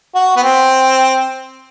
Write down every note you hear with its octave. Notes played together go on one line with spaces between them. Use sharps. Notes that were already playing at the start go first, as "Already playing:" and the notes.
F#4
B3
C4